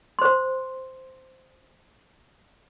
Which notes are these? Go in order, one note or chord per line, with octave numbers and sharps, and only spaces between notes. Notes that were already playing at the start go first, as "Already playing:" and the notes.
C5 C6